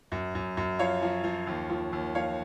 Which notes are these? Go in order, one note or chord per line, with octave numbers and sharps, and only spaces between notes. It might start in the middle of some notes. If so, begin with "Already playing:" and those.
F#2
F#2
F#2
F3 C#5 F5
F3
F3
D#2
F3
D#2
F3 C#5 F5